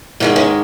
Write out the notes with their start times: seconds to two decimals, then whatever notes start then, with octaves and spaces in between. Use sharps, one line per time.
0.20 G#2 D#3 G#3 C#4
0.36 C#4